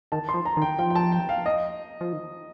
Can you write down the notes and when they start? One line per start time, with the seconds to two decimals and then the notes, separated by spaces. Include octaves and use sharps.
0.12 D#3 A5
0.29 C6
0.34 F3
0.45 A#5
0.57 D#3
0.62 G5
0.79 F3 G5
0.90 G5
0.95 A5
1.12 G5
1.29 F5
1.46 D#5
2.01 F3
2.13 D#3